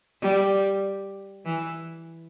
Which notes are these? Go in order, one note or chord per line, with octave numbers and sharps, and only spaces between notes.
G3
E3